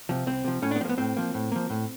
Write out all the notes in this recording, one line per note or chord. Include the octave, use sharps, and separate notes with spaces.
C3 F3
C2 C4
C3 F3
A2 C#4
D4
B3
F3 A#3 C4
B3
A2 C4
F3 A#3
A2
F3 A#3
A2